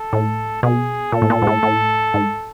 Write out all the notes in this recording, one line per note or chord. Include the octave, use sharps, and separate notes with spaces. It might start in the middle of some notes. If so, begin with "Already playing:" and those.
Already playing: A4
A2
B2 G#4
A#2 A4
A2
A#2
G#2
A2
A2
G#2